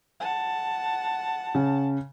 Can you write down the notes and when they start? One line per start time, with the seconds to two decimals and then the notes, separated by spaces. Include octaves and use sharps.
0.20 F#5 A5
1.55 C#3